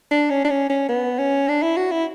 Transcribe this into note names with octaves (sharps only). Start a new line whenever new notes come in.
D4
C#4
D4
C#4
C#4
B3
C#4
D4
E4
F#4
E4